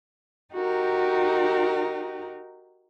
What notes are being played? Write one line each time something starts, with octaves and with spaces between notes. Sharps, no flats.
D#4 F#4 G4 A#4